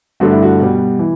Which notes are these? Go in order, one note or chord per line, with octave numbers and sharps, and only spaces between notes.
G2 D3 A3 F#4
E4
F#4
B2 G3
E3